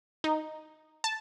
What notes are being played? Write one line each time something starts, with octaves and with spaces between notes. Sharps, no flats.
D#4
A5